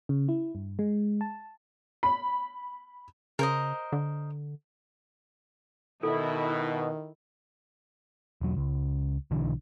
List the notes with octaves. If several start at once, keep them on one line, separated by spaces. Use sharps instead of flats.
C#3
E4
G2
G#3
A5
B5
C#3 A#4 C5 D#5
D3
B2 D#3 E4 A4
E1 F#3
C#2
B1 D3 E3